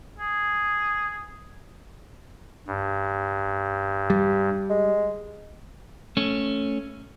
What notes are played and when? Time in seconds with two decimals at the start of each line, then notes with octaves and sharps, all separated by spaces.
0.19 G#4
2.67 G2
4.10 G3
4.70 G#3
6.17 A3 C#4